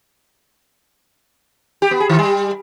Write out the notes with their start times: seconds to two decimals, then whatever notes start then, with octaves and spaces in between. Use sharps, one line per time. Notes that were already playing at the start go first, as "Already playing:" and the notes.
1.82 G4
1.91 B3
2.00 G#4
2.10 D#3
2.19 G3